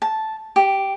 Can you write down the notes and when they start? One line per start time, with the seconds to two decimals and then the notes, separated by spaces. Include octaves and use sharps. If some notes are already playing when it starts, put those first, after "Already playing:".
0.02 A5
0.56 G4